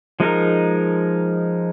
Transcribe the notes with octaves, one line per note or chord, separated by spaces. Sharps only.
F3 G#3 D#4 A#4